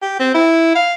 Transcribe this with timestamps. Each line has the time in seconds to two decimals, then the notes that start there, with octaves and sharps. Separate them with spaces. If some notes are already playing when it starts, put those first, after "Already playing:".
0.02 G4
0.19 C4
0.34 E4
0.75 F5